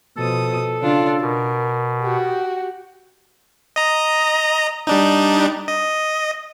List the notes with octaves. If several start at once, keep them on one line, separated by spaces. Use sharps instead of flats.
B2 F3 A4 D#6
C#3 D4 F4
B2 A#4
F#4 G4
D#5 A#5
G3 D4 D#4
D#5